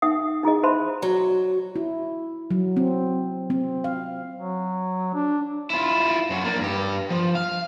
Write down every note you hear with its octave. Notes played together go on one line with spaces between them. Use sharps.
D#4 E5 G5 D#6
D#4 E4 G#4 D#5
C5 E5 A5 B5 C6
F#3
E4
F#3
C4
C4
F5
F#3
D4
E4 F4
F#2 F#3
A#3 D4
G2 G4
F3
F5